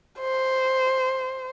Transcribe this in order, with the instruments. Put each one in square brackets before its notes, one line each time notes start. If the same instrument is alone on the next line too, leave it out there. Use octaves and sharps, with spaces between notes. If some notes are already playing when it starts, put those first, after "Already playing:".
[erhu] C5